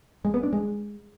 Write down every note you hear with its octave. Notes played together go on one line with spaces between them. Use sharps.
G#3
B3
D4
G#3